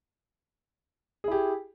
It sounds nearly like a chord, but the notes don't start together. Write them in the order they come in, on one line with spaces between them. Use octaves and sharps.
G#4 E4 G4